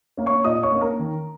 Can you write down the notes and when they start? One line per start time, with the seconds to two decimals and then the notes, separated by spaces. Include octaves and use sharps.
0.17 A#3 C#4
0.26 C#5 C#6
0.44 A#2 D#5 D#6
0.63 C#5 C#6
0.72 A#3 C#4
0.81 A#4 A#5
0.99 D#3